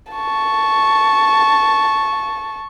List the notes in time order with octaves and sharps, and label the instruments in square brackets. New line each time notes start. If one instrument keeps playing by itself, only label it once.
[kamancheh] A5 C#6